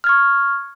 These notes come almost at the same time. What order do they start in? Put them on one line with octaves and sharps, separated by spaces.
F6 G#6 C#6